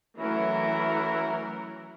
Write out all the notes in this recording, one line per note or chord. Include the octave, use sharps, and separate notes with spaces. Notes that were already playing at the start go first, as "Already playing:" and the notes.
E3 F#3 A3 C#4 E4 F#4 A#4